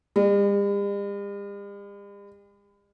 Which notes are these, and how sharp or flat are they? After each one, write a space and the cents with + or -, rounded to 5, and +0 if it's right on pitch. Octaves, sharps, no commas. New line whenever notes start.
G3 +45